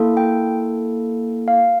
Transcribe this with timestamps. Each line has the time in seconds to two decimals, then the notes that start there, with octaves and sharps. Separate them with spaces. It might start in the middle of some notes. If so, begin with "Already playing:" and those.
Already playing: A#3 E4 A4
0.17 G5
1.48 F5